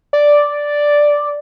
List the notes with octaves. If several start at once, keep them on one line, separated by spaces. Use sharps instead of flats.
D5